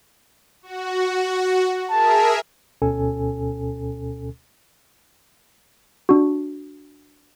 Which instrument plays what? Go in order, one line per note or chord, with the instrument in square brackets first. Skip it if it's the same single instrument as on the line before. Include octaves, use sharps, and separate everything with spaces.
[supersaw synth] F#4
[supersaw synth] G#4 A#4 E5 [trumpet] A5
[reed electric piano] D2 B2 C#4 A4 G#5
[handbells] D4 F#4